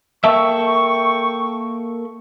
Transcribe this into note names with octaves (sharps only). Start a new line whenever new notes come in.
A#3 A4 E5 G5 C#6